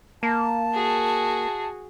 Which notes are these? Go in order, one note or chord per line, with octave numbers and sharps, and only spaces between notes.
A#3 A5
F#4 G#4